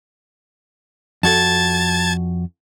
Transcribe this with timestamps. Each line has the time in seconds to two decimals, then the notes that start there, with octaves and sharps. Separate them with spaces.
1.23 F2 F#4 A4 A5 G#6 A6